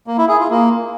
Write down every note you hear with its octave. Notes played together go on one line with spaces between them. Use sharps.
A#3
E4
G#4
F4
A#3